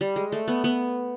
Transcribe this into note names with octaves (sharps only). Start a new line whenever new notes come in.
G3
G#3
A3
B3
B3